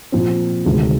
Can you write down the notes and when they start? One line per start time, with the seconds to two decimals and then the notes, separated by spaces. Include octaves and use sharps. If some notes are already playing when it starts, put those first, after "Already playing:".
0.12 A#2 F3 C4
0.65 D2 C3 D#3 G#3